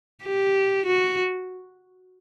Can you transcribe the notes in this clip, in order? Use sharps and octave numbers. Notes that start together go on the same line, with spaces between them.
G4
F#4